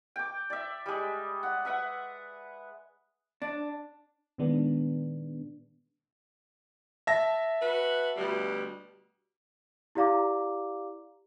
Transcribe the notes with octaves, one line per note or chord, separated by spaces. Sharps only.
G5 D6
D5 E5
G3 G#3
F#5
B4 E5 F#5
D4
A#2 D#3 G#3 B3 D4
E5 A5 A#6
F#4 B4
D2 B2 G3
E4 G4 D5 F5 A#5 D6